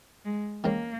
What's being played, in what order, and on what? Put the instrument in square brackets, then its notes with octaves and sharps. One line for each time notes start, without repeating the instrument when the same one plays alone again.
[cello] G#3
[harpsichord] E2 D#3 G#3 C#4 [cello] A#3